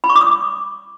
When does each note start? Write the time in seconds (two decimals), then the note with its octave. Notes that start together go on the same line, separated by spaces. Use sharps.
0.04 B5
0.10 C#6
0.15 D6
0.21 D#6